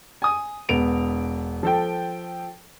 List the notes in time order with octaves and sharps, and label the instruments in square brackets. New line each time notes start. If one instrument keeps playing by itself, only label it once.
[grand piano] G#5 D#6
E1 B3 D7 F7
F3 A4 G5